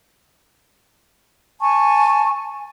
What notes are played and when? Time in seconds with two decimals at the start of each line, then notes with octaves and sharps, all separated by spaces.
1.61 G#5 A5 C#6